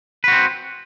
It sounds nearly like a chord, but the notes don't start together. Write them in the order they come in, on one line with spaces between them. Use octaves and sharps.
B4 F#4 C4